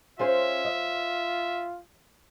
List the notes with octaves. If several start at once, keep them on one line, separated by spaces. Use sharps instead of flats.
C#4 F4 G#4 C5 E5
D#5